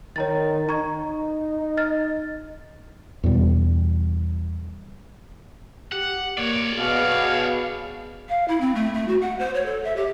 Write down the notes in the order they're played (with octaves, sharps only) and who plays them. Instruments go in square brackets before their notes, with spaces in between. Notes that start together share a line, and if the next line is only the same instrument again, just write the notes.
[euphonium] D#3 [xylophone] C#5 A#5 A6
[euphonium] D#4 [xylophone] A#5 C#6 G#6
[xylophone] D#5 F6 A6
[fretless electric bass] E2 B2 G3
[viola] G4 [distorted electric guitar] F#5
[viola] A#3 [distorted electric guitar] C#5 D5
[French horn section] B2 [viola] G#4 F5
[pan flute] F5
E4
C4
A3
A3
F#4
F#5
C5
C#5
A4
E5
G4